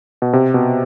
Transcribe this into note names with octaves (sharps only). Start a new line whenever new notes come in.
B2
C3
B2